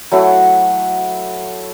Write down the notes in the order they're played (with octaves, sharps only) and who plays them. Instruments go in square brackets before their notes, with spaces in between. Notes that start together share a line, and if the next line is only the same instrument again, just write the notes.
[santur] F#3 A3 E4 F#5